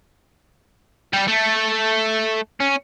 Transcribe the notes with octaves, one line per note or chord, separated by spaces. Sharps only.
G3 G4
A3
C#4